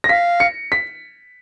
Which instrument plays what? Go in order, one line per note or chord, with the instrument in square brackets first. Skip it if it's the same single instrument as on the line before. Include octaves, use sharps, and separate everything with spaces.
[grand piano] A#6
[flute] F5 [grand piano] B6
[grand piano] C#7
B6